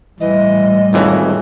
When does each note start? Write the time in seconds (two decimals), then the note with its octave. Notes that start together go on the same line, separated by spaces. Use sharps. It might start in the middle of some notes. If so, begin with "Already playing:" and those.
0.20 A2 E3 G3 D#5
0.93 G#1 F2 E3 C#4